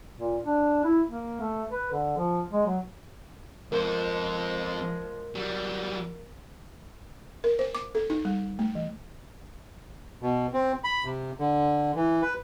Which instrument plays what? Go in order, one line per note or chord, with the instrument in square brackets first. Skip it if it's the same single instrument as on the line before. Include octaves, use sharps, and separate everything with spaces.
[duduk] A#2
D4
E4
A#3
A3
B4
D3
F3
G#3
F#3
[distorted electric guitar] F2 C5 [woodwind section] F3 G#3 [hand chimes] A#4
[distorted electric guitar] F#3 G3
[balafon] A#4
C5
D6
A4
D#4
G3
A3
E3
[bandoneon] B2
C4
B5
C3
D3
E3
B4